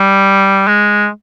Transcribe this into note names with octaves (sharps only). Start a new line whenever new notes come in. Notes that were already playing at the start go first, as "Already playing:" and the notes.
Already playing: G3
G#3